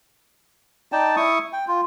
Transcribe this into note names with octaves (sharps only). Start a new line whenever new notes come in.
D#4 D5 G5 A5
E4 C#6 D#6
G5
F4